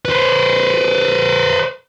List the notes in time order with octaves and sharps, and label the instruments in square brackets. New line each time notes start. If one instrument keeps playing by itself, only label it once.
[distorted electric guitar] B4 C5